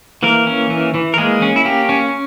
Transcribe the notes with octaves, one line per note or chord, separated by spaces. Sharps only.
E3 A#3 A#4
C#4
E3
E3
A#4
G#3 A#3 G#4
C#4
E4
A#3 G4
C#4